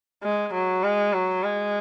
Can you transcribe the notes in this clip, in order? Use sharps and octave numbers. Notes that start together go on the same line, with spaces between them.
G#3
F#3
G#3
F#3
G#3